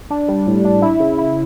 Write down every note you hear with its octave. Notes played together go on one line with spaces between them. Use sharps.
D4
G3
A2
D4
E4
C#3
E4